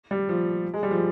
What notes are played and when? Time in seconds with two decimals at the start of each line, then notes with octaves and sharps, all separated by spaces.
0.11 G3
0.29 F3
0.74 G#3
0.83 G3
0.91 F3